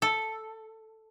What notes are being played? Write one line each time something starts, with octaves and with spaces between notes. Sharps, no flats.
A4